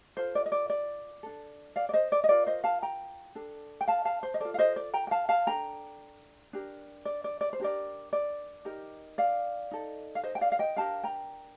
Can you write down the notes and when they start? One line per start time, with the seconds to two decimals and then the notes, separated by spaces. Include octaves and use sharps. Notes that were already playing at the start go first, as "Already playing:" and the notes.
0.17 F4 A4 C5
0.35 D5
0.46 D#5
0.52 D5
0.70 D5
1.23 D4 A4
1.76 D5 F5
1.89 D5
1.93 C5 D#5
2.12 D5
2.24 D#5
2.29 F4 A#4 D5
2.46 C5 D#5
2.64 F5 A5
2.82 G5 A#5
3.35 D4 A4
3.81 G5
3.88 F5 A5
4.05 F5 A5
4.23 C5
4.34 D#5
4.40 F4 A4 D5
4.54 F5
4.59 C5 D#5
4.76 D5
4.94 G5 A#5
5.07 G5
5.11 F5 A5
5.29 F5 A5
5.47 D4 A4 G5 A#5
6.53 D4 G4 A#4
7.05 D5
7.24 D5
7.41 D5
7.53 C5
7.60 D4 G4 A#4 D5
8.13 D5
8.65 D#4 G4 A#4
9.18 D5 F5
9.71 D#4 A4
10.15 F5
10.23 C5 D#5
10.35 G5
10.41 D5 F5
10.52 F5
10.59 D#5 G5
10.76 D4 G4 A#4 F5 A5
11.04 G5 A#5